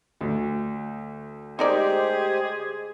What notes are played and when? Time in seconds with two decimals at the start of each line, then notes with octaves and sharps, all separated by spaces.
0.21 D2
1.59 G#3 D#4 G4 G#4 A#4 C5 D5